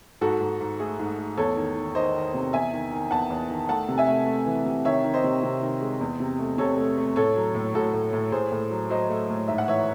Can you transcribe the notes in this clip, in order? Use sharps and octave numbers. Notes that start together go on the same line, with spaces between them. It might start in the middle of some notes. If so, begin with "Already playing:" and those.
G#2 F#4 A4
G#2
G#2
A3 G#4
G#2
A3
E2 A4 C#5
D#3
D#3
D#3 C5 D#5
D#3
C3
E2 E5 G#5
D#3
D#3
E2 F#5 A5
E2
D#3
A3 F#5 A5
C3
E5 G#5
A3
A3
E3
C3
D#3 C#5 E5
D#3
C5 D#5
C3
C3
D#3
G#3
E2
C3
A3
C3 A4 C#5
A3
A3
A2 A4 C#5
F#3
A2
A2 F#4 A4
A2
A2
A2 G#4 C5
A2
F#3
F#3 C5 D#5
A3
A2
G#2 E5
F#5
E3 C#5 E5